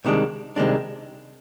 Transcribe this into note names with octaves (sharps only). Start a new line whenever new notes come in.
C2 C3 D#3 G#3 D4
C2 C3 D#3 G#3 D4